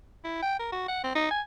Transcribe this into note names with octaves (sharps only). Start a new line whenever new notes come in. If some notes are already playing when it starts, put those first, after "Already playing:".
E4
G5
A#4
F#4
F#5
C4
D#4
G#5